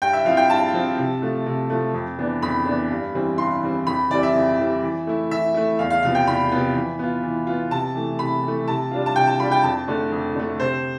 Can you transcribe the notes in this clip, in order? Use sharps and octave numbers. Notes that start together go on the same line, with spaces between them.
G2 G5
E5
F3 C4 E4 F5
G5
G2 A5
F3 C4 E4
C3
F3 A3
C3
F3 A3
F2
E3 B3 D4
F2 B5
E3 B3 D4
G2
E3 G3 C4
G2 C6
E3 G3 C4
F2 B5
E3 G3 C4 D5
E5
F2
E3 G3 C4
E3
A3 E4
E3 E5
A3 E4
E2 F5
F5
C3 F3 B3 F5
G5
E2 B5
C3 F3 B3
E3
B3 F4
E3
B3 F4
C3 A5
E3 A3
C3 B5
E3 A3
C3 A5
G3 D4 F4
A5
C3 G5
A5
G3 D4 F4 B5
G5
F2 A5
D3 A3
F2
D3 A3
C3 C5